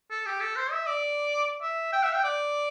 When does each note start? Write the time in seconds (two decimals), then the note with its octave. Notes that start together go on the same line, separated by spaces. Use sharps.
0.10 A4
0.26 G4
0.40 A4
0.56 C5
0.72 E5
0.87 D5
1.62 E5
1.93 G5
2.03 E5
2.13 G5
2.24 D5